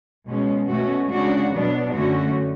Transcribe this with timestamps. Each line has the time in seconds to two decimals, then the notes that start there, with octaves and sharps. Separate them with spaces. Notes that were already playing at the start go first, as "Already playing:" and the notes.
0.27 B2 G#3 C#4
0.69 B2 A3 C#4 F#4
1.10 C#3 G#3 D4 F#4
1.53 B2 F#3 B3 D4
1.94 F#2 D3 A3 C#4 F#4